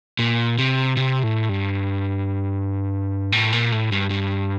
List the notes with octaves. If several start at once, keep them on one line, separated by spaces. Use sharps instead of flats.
A#2
C3
C3
A2
G2
A2
A#2
A2
G2
G2